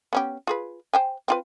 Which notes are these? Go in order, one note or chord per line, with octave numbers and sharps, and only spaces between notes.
B3 C#4 G4
F4 G#4 B4
C5 G5 G#5
C4 F4 B4